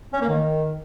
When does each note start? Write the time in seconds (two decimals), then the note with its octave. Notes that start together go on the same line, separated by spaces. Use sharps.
0.12 C#4
0.20 A#3
0.29 D#3